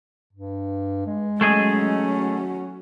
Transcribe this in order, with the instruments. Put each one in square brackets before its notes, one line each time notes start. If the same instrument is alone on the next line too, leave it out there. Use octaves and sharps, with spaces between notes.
[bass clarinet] G2
G#3
[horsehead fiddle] F#3 C#4 [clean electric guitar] A3 G#4 D#5
[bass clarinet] F#4